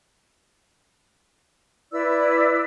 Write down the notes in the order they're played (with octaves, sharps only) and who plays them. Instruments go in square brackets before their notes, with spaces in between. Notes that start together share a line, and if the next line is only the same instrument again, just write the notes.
[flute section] E4 B4 D5 E6